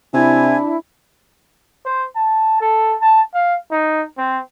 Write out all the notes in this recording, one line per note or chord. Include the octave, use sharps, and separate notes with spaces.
C3 D4 E4 G#5
C5
A5
A4
A5
F5
D#4
C4